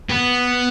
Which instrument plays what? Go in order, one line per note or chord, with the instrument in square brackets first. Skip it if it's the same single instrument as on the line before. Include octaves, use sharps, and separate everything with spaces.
[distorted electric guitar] B3